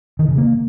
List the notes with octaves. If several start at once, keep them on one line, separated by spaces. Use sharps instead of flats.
D#3
C#3
A#3